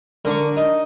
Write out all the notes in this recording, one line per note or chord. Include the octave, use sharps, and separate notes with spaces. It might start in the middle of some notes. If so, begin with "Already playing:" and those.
D3 D4 A#4 A#5 C#6
D#4